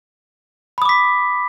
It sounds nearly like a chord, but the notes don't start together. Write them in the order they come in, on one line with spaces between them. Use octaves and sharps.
B5 D#6 D6 B6